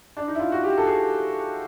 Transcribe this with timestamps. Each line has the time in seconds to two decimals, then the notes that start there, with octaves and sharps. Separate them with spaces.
0.17 D4
0.28 D#4
0.35 E4
0.39 F4
0.52 F#4
0.64 G4
0.78 A4
0.86 G#4